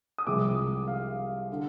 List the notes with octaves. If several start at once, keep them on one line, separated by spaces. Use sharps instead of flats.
D#6
C2 C3 F3 G#3 D6
F5
D3